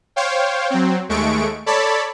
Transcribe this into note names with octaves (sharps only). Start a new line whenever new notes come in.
C5 C#5 F5 G5
F#3 C4
D#2 G#3 A3 C#6 D7
A4 C#5 D5 A5 B5